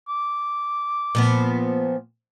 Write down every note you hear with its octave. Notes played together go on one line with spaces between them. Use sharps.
D6
A#2 F3 B3